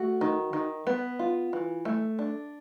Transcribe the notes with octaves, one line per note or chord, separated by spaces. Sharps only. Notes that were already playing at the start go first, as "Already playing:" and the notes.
Already playing: A3 F#4
D#3
D#3
B3
F4
E3
A3
D4